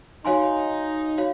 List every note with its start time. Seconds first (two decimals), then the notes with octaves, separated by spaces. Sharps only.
0.25 D#4 F#4 C#5 F5 G#5 C6
1.18 F#4 C#5 F5